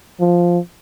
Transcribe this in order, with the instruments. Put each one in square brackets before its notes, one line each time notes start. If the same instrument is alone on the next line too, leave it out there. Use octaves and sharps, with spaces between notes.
[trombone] F3